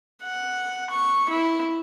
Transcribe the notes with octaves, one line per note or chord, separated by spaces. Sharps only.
F#5
C#6
E4